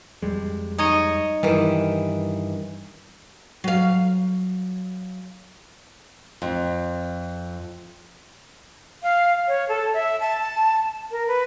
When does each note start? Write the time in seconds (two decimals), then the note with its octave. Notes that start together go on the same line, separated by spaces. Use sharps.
0.22 F2 G3 G#3
0.78 D#4 C#5 D#5
1.43 G2 D#3 E3 G3
3.64 F#3 F5
6.42 F2
9.03 F5
9.48 C#5
9.69 A4
9.94 E5
10.20 A5
11.11 A#4
11.27 B4